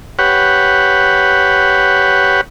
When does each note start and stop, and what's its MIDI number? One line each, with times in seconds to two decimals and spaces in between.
0.19 2.41 67
0.19 2.41 71
0.19 2.41 73
0.19 2.41 78